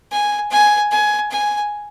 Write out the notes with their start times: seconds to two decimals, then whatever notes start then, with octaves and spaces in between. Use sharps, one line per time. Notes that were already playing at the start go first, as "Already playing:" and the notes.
0.11 G#5
0.51 G#5
0.91 G#5
1.31 G#5